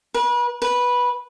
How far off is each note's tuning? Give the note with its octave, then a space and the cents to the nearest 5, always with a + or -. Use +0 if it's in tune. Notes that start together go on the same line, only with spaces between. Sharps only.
B4 -35
B4 -10